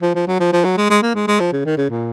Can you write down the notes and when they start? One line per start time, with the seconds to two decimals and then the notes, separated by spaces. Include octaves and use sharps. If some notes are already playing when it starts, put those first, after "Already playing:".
0.02 F3
0.15 F3
0.27 F#3
0.40 F3
0.53 F3
0.65 F#3
0.77 G#3
0.90 G#3
1.02 A#3
1.15 G#3
1.28 G#3
1.40 F3
1.53 C#3
1.65 D#3
1.78 C#3
1.90 A#2